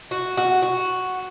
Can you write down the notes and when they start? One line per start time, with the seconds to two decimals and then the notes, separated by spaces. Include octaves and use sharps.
0.11 F#4
0.37 F#4
0.62 F#4